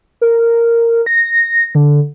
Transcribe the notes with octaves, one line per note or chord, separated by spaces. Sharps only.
A#4
A#6
D3